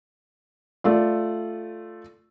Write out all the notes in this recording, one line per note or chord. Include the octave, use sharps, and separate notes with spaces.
A3 F4 D5